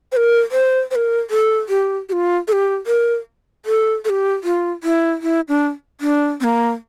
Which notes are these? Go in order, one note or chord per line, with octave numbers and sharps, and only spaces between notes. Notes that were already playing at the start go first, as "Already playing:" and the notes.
C5
A#4
C5
C5
A#4
A4
G4
G4
F4
A4
G4
A#4
A4
A4
G4
F4
E4
E4
D4
D4
C4
A#3